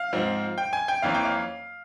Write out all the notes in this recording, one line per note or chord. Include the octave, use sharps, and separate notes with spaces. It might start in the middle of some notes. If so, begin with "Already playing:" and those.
Already playing: F5
G#2 F3 C4
G5
G#5
G5
F2 E3 A#3 C#4 F5
G5
F5